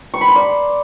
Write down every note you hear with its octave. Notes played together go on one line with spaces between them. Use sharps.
C#6
B5
C6
D5